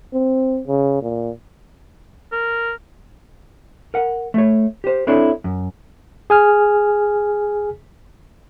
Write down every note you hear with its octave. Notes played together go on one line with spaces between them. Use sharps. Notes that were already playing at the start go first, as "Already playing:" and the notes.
C4
C#3
A#2
A#4
A#4 F#5
A3 C#5
G4 C5
C4 D4 E4 A4 C#5
F#2
G#4 G#5 F6